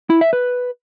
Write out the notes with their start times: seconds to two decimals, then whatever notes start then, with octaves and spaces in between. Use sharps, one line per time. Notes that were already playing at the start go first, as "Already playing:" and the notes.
0.10 E4
0.21 E5
0.33 B4